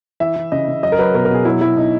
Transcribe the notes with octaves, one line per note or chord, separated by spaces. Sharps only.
E3 E5
E3
C#3 D#5
C#3
F#3 D#5
A#4
F#3 B4
B2 A#4
A#4
B2 G#4
F#3 E4
F#3 E4
B2 D#4